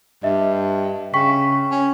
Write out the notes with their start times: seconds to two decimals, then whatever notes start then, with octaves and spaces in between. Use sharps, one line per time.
0.23 G2 D#5 E5
1.14 C#3 G5 C#6 B6
1.71 C#4